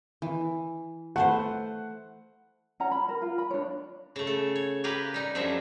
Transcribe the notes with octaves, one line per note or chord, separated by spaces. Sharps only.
E3
A3 B4 C5 F#5
C#4 F#5 A#5
B5
A#4
F4
B5
D4 C#5
C#3 A3
A4
C#5
G4 G#4 A#4 B4 F5
G3 D#4
F#2 F3 C4 D4 G#4 E5